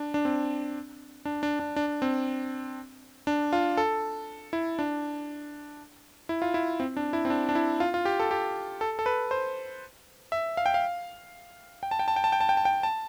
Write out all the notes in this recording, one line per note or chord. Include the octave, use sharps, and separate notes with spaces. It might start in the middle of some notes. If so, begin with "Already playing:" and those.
Already playing: D4
D4
C4
D4
D4
D4
D4
C4
D4
F4
A4
E4
D4
E4
F4
E4
C4
D4
E4
C4
D4
D4
E4
F4
F4
G4
A4
G4
A4
A4
B4
C5
E5
F5
G5
F5
G5
A5
G5
A5
G5
A5
G5
A5
G5
A5
G5
A5